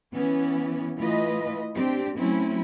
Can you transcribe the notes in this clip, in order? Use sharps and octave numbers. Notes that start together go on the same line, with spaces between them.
E3 B3 C#4
E3 A3 F4 B4 D#5
C4 D4 G4
F#3 A3 C4 C#4 E4